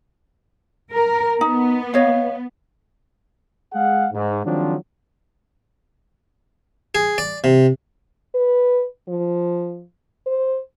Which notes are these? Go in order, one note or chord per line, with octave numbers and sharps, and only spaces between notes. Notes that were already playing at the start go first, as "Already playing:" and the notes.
A#4
B3 D#4
C#5 D#5 F5
G#3 G#4 F5 F#5
G#2
D#3 F3 F#3 G#3 C4 D4
G#4
D5
C3
B4
F3
C5